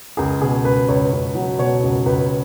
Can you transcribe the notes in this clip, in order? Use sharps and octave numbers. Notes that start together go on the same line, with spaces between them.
C#2 G#4
B2 G#4
C#2 B4
C#2 C#5
C#2
F#3
B2 C#5
C#2
C#2 B4